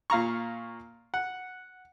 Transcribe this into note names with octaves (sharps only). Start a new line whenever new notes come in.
A#2 F5 A#5 C#6
F#5